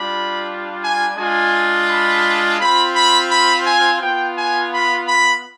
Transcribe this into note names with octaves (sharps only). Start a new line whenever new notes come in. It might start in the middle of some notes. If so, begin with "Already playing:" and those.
Already playing: G3 D4 F4 B5
G#5
G#3 D4 F4 G#5
B5
C4 F4 B5
B5
B5
G#5
B3 F4 G5
G#5
B5
B5